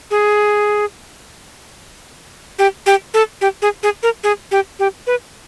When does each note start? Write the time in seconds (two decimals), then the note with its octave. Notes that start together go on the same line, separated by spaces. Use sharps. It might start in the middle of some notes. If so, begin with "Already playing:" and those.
0.11 G#4
2.59 G4
2.86 G4
3.14 A4
3.41 G4
3.62 G#4
3.83 G#4
4.03 A#4
4.24 G#4
4.51 G4
4.79 G4
5.07 B4